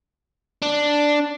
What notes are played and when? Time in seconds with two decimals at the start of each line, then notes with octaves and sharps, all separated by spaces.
0.62 D4